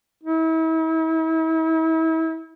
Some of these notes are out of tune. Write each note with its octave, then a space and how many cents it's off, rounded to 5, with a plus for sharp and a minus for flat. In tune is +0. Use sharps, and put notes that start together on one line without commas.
E4 -40